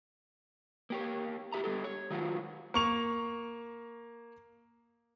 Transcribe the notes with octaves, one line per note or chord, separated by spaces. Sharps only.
A#3 G4 C#5
E4 G4 E5 A#5
G3 G4 A4
C#5
D#3 F#3 F4 F#4
A#3 C#6 F7